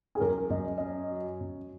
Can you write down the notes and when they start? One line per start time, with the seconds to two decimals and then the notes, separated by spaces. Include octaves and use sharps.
0.15 G#4
0.20 F#2 A#4
0.50 F#2 D#5
0.78 C#4 D#5
1.11 F#3
1.40 F#2